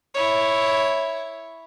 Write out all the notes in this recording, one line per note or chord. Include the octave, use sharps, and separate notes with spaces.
E4 C#5